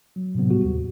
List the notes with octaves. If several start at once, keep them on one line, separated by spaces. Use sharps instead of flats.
F#3
A2 C3 D#3 F#3 B3
G3 F#4 G4
D#2